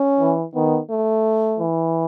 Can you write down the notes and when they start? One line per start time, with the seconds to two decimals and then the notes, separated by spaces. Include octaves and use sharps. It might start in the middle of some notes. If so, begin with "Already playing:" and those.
Already playing: C#4
0.20 E3
0.54 D#3 B3
0.90 A3
1.60 E3